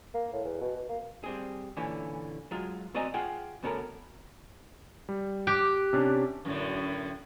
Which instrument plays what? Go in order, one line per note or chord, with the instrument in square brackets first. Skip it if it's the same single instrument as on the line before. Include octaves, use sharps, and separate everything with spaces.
[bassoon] A#3
A2
E2
B2
B2
A#3
[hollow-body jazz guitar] G3 C4 G#4
A#2 D3 E3 C#4
F#3 G#3 F4
C4 F#4 D5 D#5 G#5 A#5
F4 G#4 F#5 G5
D2 B3 C#4 A4 A#4
[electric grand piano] G3
[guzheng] G4 [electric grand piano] D6 F#6
[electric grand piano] C3 C#4 D4
[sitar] F#2 A2 D3